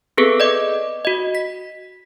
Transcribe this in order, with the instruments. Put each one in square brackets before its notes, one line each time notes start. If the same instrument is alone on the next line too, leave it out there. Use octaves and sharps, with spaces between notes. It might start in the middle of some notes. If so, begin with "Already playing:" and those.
[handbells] B3 C4 G#4 A4 B4
D5 D#5 D6
F#4 D#5
B6